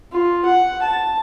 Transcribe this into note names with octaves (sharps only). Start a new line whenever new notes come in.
F4
F#5
A5